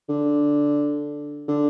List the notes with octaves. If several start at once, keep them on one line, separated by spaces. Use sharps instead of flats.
D3
D3